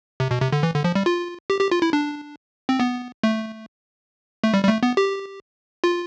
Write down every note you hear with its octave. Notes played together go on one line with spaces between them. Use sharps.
C3
B2
C3
D3
E3
D3
F3
G3
F4
G4
G4
F4
E4
D4
C4
B3
A3
A3
G3
G3
A3
B3
G4
F4